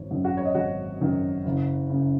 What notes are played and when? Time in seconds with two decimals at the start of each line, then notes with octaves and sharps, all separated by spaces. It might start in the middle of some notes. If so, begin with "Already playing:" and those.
Already playing: G#1 C#5
0.10 F#2 D#3 F#3
0.25 F#4 F#5
0.37 C#5
0.45 D#5
0.55 G#1 F#4 F#5
0.99 F#2 D#3 F#3
1.45 F#1
1.90 F#2 C#3